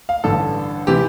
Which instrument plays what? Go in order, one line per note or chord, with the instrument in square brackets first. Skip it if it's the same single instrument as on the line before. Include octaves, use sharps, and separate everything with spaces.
[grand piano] F5
A1 G2 D3 A4
C3 E3 G4